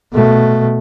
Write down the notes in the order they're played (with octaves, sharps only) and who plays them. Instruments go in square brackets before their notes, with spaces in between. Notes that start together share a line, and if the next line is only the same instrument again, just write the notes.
[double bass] B2 A3